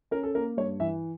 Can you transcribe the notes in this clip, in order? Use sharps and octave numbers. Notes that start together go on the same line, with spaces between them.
C#4 A#4
A4
A#3 A#4
G2 C#5
E3 E5